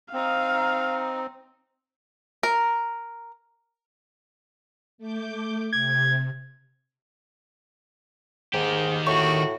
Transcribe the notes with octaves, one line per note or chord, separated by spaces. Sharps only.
C4 D#4 F5
A#4
A3 D6 G6
C3 G#6
G#2 D#3 G4
A2 F#4 C#6